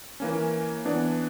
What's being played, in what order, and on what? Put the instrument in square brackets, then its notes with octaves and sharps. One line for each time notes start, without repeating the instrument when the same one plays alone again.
[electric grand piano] E3 A#3 C#4
E3 B3 D4